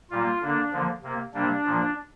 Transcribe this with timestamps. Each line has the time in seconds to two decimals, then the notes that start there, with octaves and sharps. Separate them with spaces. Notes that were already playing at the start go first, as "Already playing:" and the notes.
0.10 A#2 G3 A#3 F4
0.41 D3 A#3 D4
0.72 D3 F3 A#3
1.03 C3 A#3
1.34 C3 G3 A#3 D4
1.66 A#2 F3 A#3